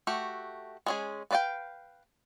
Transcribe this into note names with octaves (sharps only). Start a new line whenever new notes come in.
A3 F#4 G4
G#3 C#4 G#4
B3 B4 D5 F5 G5